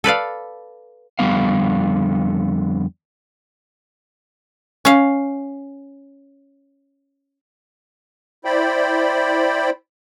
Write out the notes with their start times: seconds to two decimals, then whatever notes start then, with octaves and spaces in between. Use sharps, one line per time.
0.04 A4 B4 D5 F5
1.19 F2 D3 G3 B3 F5
4.85 C#4 F5
8.45 E4 C5 D5 G5 B5